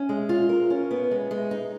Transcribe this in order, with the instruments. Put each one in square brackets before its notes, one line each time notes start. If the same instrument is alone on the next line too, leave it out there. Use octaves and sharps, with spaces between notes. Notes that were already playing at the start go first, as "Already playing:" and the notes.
Already playing: [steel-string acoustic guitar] C#4
G#3
F4
A#4
C#4
B3
G#3
G#3
D#4